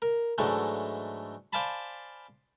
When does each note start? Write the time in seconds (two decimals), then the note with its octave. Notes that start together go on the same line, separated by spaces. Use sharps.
0.02 A#4
0.38 G#2 D3 E3 F#3 G#3 A3
1.53 C5 D5 F5 G#5 A5 B5